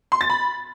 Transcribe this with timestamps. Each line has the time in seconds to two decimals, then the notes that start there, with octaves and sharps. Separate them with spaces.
0.12 C6
0.21 A6
0.30 B5